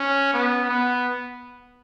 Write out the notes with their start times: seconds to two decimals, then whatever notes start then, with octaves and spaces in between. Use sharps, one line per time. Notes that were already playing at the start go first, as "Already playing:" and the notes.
Already playing: C#4
0.34 B3
0.69 B3